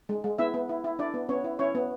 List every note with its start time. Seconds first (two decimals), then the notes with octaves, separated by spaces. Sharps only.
0.09 G#3
0.24 G#3
0.38 B3 E4 E5
0.54 B3
0.69 E4
0.84 E4
0.99 D4 E4 D5
1.14 B3
1.29 B3 C#4 C#5
1.44 E4
1.59 C#4 E4 C#5
1.75 B3